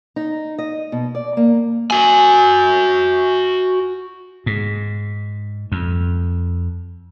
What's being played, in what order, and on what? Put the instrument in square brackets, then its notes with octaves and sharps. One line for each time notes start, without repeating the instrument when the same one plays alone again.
[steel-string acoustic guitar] D#4
D#5
B2
D5
A#3
[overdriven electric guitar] F#4 G#5
[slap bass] G#2
F2